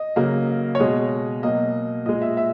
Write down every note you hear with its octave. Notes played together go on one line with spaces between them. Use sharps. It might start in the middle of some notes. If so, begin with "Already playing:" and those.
Already playing: D#5
C#3 F#3 A#3
C#5
B2 G#3 D#5
B2 F#3 A#3 D#5
A#2 G#3 D#5
E5
E5